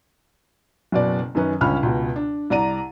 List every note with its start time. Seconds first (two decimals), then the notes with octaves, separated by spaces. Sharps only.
0.92 F#1 B2 D5
1.35 F#2 D#3 C#4 B4
1.61 G1 C#2 C#4 B5 F6
1.83 C#2 B2
2.16 D4
2.50 C2 D5 A#5 D#7